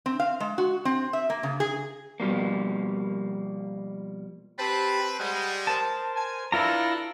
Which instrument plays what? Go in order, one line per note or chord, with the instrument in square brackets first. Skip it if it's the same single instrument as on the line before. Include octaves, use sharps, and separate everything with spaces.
[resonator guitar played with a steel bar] C4
F5
G#3
F#4
C4
E5
A#3
C#3
G#4
[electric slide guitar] B2 F3 G3 A#3
[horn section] C4 B4 [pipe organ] G4 A5 B5
[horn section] G3 G#3 [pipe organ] F#5
[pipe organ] A#4 C5 [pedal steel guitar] A5
[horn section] G#5
[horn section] E3 D4 A4 [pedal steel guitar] E4 F4 A#5 [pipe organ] A#6